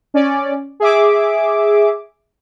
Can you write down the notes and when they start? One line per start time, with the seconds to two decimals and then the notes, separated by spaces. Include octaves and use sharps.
0.14 C#4 D5
0.80 G#4 E5 D6